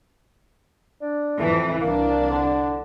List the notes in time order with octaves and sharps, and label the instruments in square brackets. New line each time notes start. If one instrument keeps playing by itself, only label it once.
[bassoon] D4
[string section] F2 E3 [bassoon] A3
[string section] C2 D4 [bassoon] A#3
[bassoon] D3